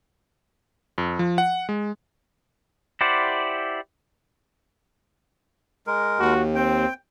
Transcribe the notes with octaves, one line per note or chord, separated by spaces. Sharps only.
F2
F3
F#5
G#3
E4 G4 C5 D5 F#5
G#3 A#4
D#2 F#4
C4 G5